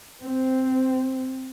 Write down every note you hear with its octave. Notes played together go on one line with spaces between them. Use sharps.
C4